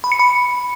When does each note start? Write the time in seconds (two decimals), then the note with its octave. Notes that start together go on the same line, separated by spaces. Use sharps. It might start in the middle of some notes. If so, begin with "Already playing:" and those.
0.04 B5
0.12 C#7
0.19 B5